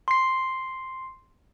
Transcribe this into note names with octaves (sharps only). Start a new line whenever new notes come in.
C6 C7